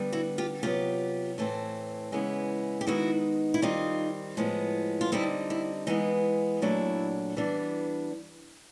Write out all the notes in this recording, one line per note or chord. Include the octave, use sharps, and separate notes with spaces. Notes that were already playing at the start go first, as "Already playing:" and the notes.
Already playing: D3 G3 B3
E4 F#4
F4 G4
C3 D#3 F#3 B3 F4 G4
A2 E3 A3 C4
C#3 E3 G#3 B3
G4
D#3 G#3 B3 D#4 E4 F#4
E4
D#3 G3 C4 D#4 F4
A2 F3 G#3 B3
F4
D3 G3 C4 D#4 E4
E4
E3 G#3 B3 D#4
A#2 F#3 A3 D4 E4
E3 G3 B3 D4